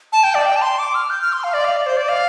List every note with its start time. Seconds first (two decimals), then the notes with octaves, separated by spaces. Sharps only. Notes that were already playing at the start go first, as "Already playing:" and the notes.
0.13 A5
0.23 G5
0.35 D5
0.45 G5
0.56 A5
0.62 C6
0.79 D6
0.94 F6
1.10 G6
1.22 F6
1.33 C6
1.44 F5
1.54 D5
1.65 F5
1.76 D5
1.86 C5
1.97 D5
2.09 F5